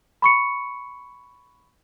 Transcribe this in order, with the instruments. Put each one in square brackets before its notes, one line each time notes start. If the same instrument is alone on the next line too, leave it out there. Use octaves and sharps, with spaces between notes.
[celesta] B5 C#6 C#7